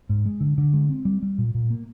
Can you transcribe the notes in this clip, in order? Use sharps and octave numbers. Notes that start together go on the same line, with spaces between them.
G#2
G#3
D3
D3
G#3
C4
G3
G3
A#2
A#2
A#3